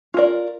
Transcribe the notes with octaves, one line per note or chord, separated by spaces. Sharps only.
F4 A#4 D5